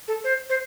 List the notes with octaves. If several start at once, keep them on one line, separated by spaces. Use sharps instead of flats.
A4
C5
C5